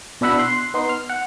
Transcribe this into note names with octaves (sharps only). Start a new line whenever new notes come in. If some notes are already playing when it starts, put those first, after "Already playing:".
B2 D4 E4 E5 F#5 B5
C6 F#6
B3 D#4 C6
F6
F#5